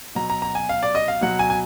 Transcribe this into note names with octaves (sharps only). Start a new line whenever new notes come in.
B2 F#3 A#5
A#5
A#5
G#5
F5
D5
D#5
F5
B2 F#3 F#5
G#5
G#5